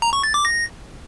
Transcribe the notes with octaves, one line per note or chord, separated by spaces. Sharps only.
A#5
C#6
A6
D6
A#6